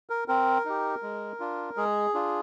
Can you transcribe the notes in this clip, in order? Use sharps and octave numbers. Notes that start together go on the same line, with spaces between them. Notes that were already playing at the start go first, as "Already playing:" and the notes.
A#4
C4 A#4
D#4 G4
G#3
D4 F4
G#3 G#4
D4 F4